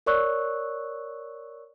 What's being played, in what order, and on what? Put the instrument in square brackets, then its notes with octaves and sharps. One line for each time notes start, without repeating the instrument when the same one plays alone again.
[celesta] A#4 C#5 D5 C#6 E6 F#6